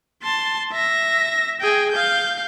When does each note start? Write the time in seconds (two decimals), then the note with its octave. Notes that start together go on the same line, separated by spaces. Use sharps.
0.23 A5 C6
0.72 E5 A#6
1.61 G#4 G5
1.92 F5 G6